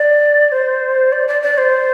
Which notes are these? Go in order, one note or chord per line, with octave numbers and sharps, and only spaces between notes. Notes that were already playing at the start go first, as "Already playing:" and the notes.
Already playing: D5
C5
D5
D5
D5
C5